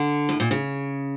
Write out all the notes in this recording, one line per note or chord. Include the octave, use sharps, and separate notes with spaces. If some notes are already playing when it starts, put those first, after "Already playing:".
Already playing: D3
A2
A#2
C#3